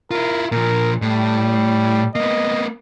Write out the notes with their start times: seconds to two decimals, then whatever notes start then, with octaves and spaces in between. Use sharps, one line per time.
0.11 E4 F4 A#4
0.52 A#2 F3 A#4
1.02 A2 G3
2.16 A#3 B3 D#5